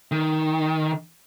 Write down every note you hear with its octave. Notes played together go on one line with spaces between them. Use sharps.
D#3